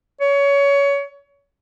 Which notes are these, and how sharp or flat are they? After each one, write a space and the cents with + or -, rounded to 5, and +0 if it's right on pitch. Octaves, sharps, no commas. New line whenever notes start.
C#5 +25